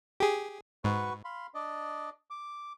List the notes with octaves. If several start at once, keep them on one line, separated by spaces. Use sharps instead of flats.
G4 G#4
G#2 F#4 B4 C#6
F5 B5 C6
D4 D5 D#5
D6